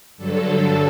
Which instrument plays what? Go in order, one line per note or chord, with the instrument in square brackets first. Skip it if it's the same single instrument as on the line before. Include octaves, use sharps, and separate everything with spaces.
[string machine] G2 D3 F#3 A4